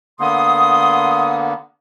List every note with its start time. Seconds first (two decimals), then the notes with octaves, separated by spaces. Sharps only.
0.20 D3 A#3 B3 C6 D#6